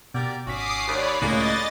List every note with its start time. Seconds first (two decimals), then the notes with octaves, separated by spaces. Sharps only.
0.14 B2 G4 A#4 D5
0.47 G#1 C#4 F#4 D6 D#6 B6 C7
0.88 D#2 C#5 D5 B5
1.22 C#2 A2 C#3 G#3 A#3 D#5 F#6 A6